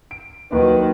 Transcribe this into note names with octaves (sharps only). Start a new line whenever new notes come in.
D7
D#2 D#3 F#3 B4 C#6